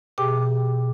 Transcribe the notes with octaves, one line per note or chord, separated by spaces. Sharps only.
B2 G4 G#4 G5 D6